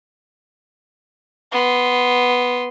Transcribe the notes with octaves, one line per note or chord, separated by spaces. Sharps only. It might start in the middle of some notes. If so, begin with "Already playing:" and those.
B3 C6